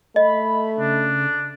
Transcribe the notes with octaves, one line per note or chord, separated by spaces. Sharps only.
A3 D#5 B5
C#3 D4